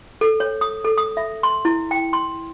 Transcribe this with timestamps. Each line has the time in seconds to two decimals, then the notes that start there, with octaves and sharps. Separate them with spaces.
0.21 A4
0.40 C#5
0.61 D#6
0.84 A4
0.98 D#6
1.17 E5
1.43 C6
1.65 E4
1.91 G5
2.13 C6